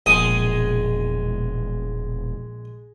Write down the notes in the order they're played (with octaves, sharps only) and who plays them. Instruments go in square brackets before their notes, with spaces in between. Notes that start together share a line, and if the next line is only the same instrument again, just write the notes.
[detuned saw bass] E1 [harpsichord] A#1 D#6 [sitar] G#3